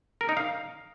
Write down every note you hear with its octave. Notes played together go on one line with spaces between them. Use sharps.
A#4
D#4
F5